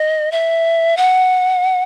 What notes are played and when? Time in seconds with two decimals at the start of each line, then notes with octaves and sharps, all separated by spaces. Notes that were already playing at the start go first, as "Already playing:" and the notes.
Already playing: D#5
0.32 E5
0.97 F#5